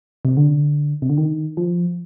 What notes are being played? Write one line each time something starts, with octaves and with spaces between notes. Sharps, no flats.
C3
D3
C3
D3
D#3
F3